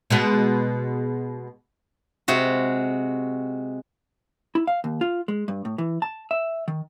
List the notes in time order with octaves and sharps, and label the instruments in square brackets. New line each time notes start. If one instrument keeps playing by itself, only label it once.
[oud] B2 G#3 B3
[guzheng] C3 G#3 F#4
[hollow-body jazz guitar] E4
F5
D#2
F4
G#3
G2
A2
E3
A5
E5
D#3